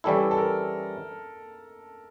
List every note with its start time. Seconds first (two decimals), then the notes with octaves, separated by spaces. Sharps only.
0.04 E3 G3 C#4 E4 A4
0.31 A4
0.37 A#4